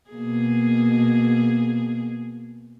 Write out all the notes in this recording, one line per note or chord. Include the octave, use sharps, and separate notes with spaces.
B2 A#3 G#4